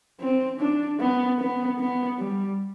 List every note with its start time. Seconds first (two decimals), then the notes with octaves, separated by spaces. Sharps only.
0.21 C4
0.60 D4
1.00 B3
1.39 B3
1.79 B3
2.18 G3